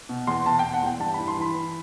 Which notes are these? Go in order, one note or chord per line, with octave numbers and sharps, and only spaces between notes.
B2
E2 C6
B2 A5
G5
B2
F#5
E2 G5
G2 A5
E3 B5
C6
E3 B5
E3